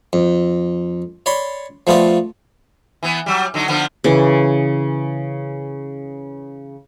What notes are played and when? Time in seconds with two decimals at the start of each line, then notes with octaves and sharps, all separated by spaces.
0.13 F2
1.26 C#5 D5 B5 C6
1.87 F3 A3 B3 F4 D5
3.03 E3 B3
3.26 F#3 G3
3.54 D3 F#3 D#4
3.68 D3 F3 B3
4.04 C#3 E3